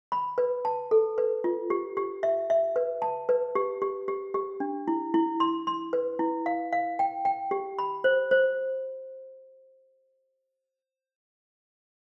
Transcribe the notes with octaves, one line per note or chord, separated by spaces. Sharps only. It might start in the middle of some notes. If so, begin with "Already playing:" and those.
B5
B4
A5
A4
B4
F4
G4
G4
E5
E5
B4
A5
B4
G4
G4
G4
G4
D4
E4
E4
C6
C6
B4
E4
F5
F5
G5
G5
G4
B5
C5
C5